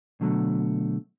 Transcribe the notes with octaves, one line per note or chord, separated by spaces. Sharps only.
B2 D3 F#3 A3